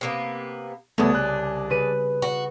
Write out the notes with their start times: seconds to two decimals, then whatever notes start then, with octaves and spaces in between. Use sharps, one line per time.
0.01 C3 A#3 B3
0.98 C2 C#3 G#3 A3 B3 D4 D#6
1.15 F#6
1.70 C#3 B4 D#7
2.22 F#4